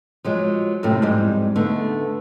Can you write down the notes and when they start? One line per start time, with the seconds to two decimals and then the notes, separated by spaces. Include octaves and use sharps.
0.24 F3 F#3 G#3
0.83 F#2 A2 C3 A3 C4
1.02 F2 G#2 G3 G#3
1.56 D3 A3 B3 D#4